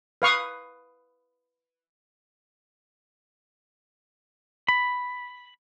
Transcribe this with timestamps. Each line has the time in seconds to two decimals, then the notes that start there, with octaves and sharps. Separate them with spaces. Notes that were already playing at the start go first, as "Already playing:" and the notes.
0.22 B4 F5 C#6 D#6
4.68 B5